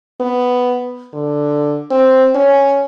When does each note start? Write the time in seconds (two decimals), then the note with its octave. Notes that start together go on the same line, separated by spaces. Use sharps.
0.21 B3
1.14 D3
1.91 C4
2.35 C#4